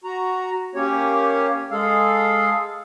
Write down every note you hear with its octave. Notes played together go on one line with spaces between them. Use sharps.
F#4 A#5
A#3 C#4 G4 C#5
G#3 G#4 A4 F5